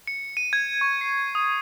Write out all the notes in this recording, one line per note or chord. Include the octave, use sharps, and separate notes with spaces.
C#7
D#7
G#6
C#6
C7
D#6